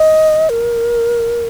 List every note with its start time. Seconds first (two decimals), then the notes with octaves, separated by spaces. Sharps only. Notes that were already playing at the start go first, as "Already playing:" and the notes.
Already playing: D#5
0.50 A#4